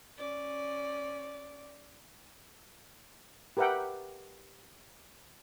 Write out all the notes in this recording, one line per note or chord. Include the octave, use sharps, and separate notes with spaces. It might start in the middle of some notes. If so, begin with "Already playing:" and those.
C#4 D5
G4 A#4 B4 E5 F#5 G5